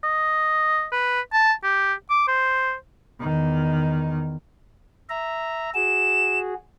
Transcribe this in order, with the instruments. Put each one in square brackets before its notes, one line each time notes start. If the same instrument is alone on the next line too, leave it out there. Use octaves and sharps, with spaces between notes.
[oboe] D#5
B4
A5
G4
D6
C5
[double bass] E2 D#3
[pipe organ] E5 A#5
[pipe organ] F#4 G#4 [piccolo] E7